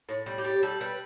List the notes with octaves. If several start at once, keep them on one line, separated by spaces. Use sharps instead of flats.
A2
G3
G4
G3
G3 A4
G3 B4